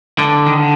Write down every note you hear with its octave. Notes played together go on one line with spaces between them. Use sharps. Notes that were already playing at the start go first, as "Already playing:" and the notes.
D3
D#3
D3